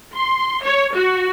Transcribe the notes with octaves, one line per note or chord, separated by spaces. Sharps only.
C6
C#5
F#4